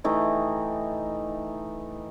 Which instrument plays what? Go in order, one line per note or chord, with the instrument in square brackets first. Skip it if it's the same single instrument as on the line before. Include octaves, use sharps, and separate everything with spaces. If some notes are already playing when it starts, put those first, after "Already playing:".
[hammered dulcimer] E3 A3 D#4 G4